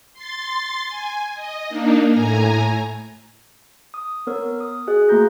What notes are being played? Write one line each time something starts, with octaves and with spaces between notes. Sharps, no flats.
C6 A6
G#5
D#5
A#3 D4 D#4
A2 G#5 A#5
D#6
B3 A#4 C#5 E6
D#6
F#4 G#4 D#5 F#6
A3 A#3 F#4 A#5 G6 A#6